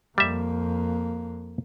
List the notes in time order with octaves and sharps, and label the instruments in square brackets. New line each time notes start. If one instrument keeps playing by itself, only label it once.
[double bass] F2 A#3 [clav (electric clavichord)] G3 E5